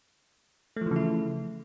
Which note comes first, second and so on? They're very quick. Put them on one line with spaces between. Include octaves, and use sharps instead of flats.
A3 F3 E3 C#3 E4